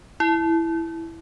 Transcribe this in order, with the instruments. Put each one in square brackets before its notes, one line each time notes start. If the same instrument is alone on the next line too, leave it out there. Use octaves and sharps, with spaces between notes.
[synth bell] E4